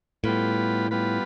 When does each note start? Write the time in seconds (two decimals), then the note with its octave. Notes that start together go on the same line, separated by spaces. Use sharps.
0.24 A2 G3 B3 F4 B4
0.91 G3 B3 F4 B4